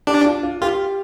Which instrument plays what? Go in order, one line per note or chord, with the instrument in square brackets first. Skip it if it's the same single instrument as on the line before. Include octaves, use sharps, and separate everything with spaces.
[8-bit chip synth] D4 [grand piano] G4
[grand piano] F4
F4
[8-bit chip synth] F4 [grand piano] G4